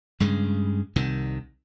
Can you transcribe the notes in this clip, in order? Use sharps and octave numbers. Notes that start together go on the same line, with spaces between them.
G2 C#3 G#3
C2 C3 D#3